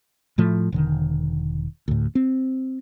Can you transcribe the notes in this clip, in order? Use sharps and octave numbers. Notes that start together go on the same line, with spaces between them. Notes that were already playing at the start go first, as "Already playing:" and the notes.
A2 F3 A3
E1 D3 D#3
D2 A2
C4